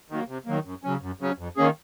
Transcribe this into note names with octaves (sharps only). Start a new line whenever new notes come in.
D#3 F#3 A#3
C3
D#3 F#3 A#3
F#2
C#3 F#3 C#4
F#2
C#3 F#3 C#4
F2
D#3 A#3 C#4 G#4